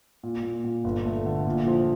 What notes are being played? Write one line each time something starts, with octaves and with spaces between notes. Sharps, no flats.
A#2
A#2
A#2
G1
A3
D3
A#2
F3